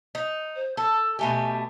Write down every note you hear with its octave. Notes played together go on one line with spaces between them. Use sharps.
D#4
C5
A4 E6
B2 A3 G4 G#5